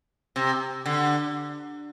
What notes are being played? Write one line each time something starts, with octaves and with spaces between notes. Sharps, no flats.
C3
D3